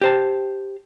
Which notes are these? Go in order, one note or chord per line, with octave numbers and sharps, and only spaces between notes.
G4 C5 A5